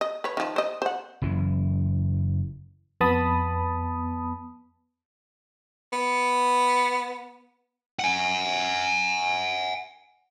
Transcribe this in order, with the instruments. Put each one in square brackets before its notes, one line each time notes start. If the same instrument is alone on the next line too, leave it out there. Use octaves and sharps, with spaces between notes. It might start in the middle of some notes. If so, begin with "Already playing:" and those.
[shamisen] D#5
B4 C#5
D#3 F3
C5 D#5
C5 F#5
[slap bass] F#1 F#2 E3
[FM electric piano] F2 B3 A5 B5 D#6
[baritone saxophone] B3
[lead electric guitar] F#5 G#5